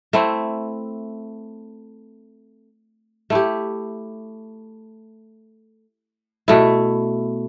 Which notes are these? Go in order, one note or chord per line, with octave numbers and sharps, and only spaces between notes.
A3 C4 E4
A3 E4 G4
B2 A3 E4